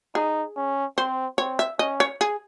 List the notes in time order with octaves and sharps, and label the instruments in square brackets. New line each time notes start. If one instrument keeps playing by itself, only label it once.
[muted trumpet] D#4 [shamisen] G#4
[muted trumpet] C#4
[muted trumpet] C4 [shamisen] C5
[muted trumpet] C4 [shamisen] C#5
[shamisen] E5
[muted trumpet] C#4 [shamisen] D#5
[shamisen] C#5
G#4